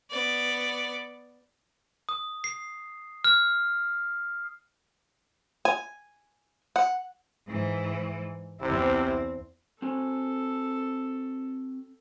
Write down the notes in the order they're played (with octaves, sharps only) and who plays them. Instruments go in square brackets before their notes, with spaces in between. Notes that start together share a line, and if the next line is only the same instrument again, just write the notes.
[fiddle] B3 D5
[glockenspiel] D#6
C7
F6
[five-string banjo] G#5
F#5
[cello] G#2 E3
[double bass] E2 E4 [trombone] C3 [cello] C4
[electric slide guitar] C4 F#4 G#5 [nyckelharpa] A4